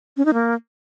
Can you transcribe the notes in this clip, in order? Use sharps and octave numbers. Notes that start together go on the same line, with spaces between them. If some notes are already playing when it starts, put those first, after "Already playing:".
C#4
D#4
A#3